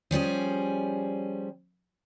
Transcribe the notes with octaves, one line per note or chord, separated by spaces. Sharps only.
F3 G3 C#4 G#4